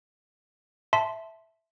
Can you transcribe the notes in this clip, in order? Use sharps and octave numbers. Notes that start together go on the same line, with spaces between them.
E5 A5 C6 B6